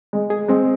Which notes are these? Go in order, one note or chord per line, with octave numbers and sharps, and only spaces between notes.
G#3
G#4
G#3 C4